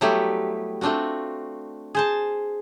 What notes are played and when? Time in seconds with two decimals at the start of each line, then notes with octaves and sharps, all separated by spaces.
0.01 F#3 G3 A3 B3 E4 G4
0.81 A3 C4 D4 F4 F#4
1.95 G#4 C5 A5